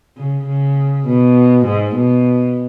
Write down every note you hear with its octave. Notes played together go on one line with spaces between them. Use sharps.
C#3
C#3
B2
G#2
B2